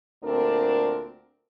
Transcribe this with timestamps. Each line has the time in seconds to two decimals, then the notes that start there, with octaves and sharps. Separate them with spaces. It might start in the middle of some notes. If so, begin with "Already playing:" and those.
0.23 D2 A#2 A3 C4 D4 A#4